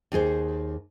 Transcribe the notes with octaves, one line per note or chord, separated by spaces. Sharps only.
D#2 D#4 G#4 C5